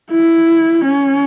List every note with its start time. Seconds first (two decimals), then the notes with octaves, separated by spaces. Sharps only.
0.11 E4
0.85 C#4